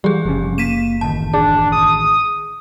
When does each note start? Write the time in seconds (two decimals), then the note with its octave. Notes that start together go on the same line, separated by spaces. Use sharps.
0.04 E3 G3 G4 G#4
0.25 F#1 C3 F3 C#4
0.58 A#3 B6 D#7 E7
1.01 A1 D#3 A5
1.33 D4 G#4
1.72 D#6